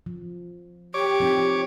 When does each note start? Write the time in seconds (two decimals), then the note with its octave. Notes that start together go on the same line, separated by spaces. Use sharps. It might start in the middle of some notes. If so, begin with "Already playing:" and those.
0.06 F3
0.94 G4 C#5 D6
1.20 F3 C4 D#4